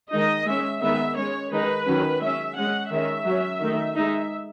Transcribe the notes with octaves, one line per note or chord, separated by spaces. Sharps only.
D#3 G#3 D#4 D#5
G#3 C#4 E5
D#3 G#3 B3 D#4 E5
G#3 C#4 C#5
D#3 G#3 D#4 B4
D#3 F#3 C#4
G#3 C#4 E5
G#3 C#4 F#5
D#3 G#3 C#4 E5
F#3 C#4
D#3 A3 D#4
G#3 D#4 E5